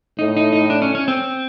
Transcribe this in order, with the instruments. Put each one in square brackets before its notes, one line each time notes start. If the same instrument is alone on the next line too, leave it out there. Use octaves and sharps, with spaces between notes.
[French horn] A2 [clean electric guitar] D#4
[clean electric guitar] D#4
D#4
D4
C#4
C#4
C4